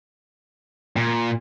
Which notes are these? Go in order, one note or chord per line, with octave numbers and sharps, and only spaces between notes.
A#2